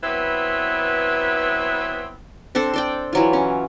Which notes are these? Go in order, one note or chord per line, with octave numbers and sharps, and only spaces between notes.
F#3 B3 C4 E4 B4
C4 D4 A4 C5
C5 D5 G5
E3 F#3 F4
C#4